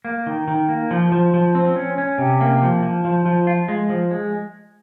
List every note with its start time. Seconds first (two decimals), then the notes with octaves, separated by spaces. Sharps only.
0.05 A#3
0.27 D#3
0.48 D#3
0.69 A#3
0.91 F3
1.12 F3
1.34 F3
1.55 C4
1.76 C#4
1.98 C#4
2.18 C3
2.41 A#3
2.62 F3
2.83 F3
3.05 F3
3.26 F3
3.47 F4
3.68 G#3
3.89 F3
4.11 G#3